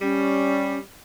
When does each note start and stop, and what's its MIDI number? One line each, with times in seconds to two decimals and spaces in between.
0.01 0.79 55
0.01 0.79 61